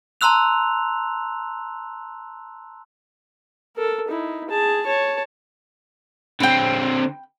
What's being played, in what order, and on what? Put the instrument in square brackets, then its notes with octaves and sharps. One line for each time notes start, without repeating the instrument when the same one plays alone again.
[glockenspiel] A5 A#5 C6 E6 F#6 F7
[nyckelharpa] A4 A#4
D#4 E4
G#4 A5
C#5 A5
[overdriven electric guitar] D3 C4 [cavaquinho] G5 B5